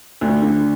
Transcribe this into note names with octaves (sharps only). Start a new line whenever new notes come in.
D2
D3